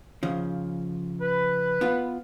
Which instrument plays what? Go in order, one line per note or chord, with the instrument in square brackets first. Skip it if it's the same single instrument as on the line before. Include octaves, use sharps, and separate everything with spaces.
[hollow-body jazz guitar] C#3 F3
[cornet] B4
[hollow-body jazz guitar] B3 F4